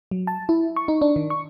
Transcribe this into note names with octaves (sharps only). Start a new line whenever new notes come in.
F#3
A5
E4
C#6
D#4
D4
D#3
C#6